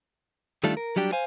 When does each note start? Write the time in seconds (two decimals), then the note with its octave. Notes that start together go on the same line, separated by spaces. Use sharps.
0.64 D#3 G3 A3 D4 F4 A4
0.77 A#4
0.96 F#3 G3 D4 G4
1.13 C5 F5 G#5